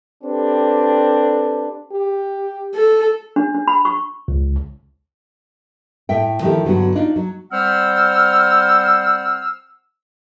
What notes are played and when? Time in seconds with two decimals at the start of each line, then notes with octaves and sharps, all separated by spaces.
0.24 C4 D4 G4 A4 B4
1.92 G4
2.74 A4
3.36 D4
3.55 D4
3.68 B5
3.85 C#6
4.28 C#2
6.09 A2 E5 G5
6.41 D#3 F3 A3 D4 E4 G4
6.65 G2 D3 F#3 B3 F#4
6.95 D4 D#4 F4
7.16 F#3
7.52 G3 C4 C5 F#5 E6 F6